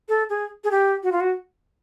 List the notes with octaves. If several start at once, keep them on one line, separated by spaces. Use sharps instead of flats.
A4
G#4
G#4
G4
F#4
F4
F#4